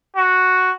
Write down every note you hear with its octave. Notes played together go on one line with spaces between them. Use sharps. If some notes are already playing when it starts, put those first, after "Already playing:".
F#4